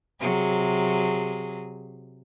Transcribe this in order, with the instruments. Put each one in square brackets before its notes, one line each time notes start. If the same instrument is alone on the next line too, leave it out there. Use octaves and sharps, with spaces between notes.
[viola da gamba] C3 F#3 G#4